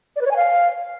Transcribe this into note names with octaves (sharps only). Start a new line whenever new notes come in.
D5
B4
C#5
G#5
F5